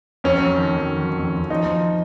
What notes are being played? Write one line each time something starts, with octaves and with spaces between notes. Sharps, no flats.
F2 C#4
F#3
D#3
F2
D#3
F#3
F2
F2
F3 D#4
F3